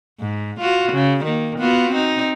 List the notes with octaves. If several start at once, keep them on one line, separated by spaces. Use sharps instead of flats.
G#2
F4 F#4
C#3
D#3 A#3
B3 F4 F#4
C4 D#4